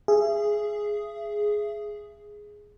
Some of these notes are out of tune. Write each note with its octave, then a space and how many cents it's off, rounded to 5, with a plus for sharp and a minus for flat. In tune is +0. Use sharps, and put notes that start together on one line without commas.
G#4 +0 E5 +30